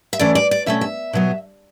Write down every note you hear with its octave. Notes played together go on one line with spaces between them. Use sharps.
E5
E3 A3 C#4 D5
D5
D5
B2 A3 C#4 E5
E5
B2 F#3 B3